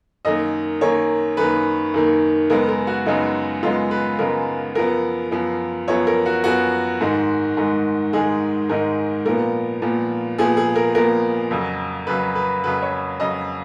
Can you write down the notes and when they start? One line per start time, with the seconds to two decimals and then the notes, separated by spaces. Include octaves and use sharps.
0.25 F#2 D#3 A#3 D#5
0.81 F#2 D#3 A#3 C#5
1.37 F#2 D#3 A#3 B4
1.94 F#2 D#3 A#3
2.50 F#2 C#3 G#3 B3 A#4
2.69 A#4
2.87 F#4
3.06 F#2 C#3 G#3 B3 D#4
3.63 F#2 C#3 G#3 B3 F4
3.91 B4
4.19 F#2 C#3 G#3 B3 A#4
4.75 F#2 F3 B3 A#4
5.31 F#2 F3 B3
5.88 F#2 F3 B3 C#5
6.07 A#4
6.26 F#4
6.44 F#2 F3 B3 F#4
7.00 G#2 D#3 G#3
7.57 G#2 D#3 G#3
8.13 G#2 D#3 G#3 G#4
8.69 G#2 D#3 G#3 A#4
9.25 A#2 F3 B3 A#4
9.82 A#2 F3 B3
10.38 A#2 F3 B3 G#4
10.57 G#4
10.76 A#4
10.95 A#2 F3 B3 A#4
11.51 F2 C#3 F#3
12.07 F2 C#3 F#3 B4
12.35 B4
12.64 F2 C#3 F#3 B4
12.82 C#5
13.20 F2 C#3 F#3 D#5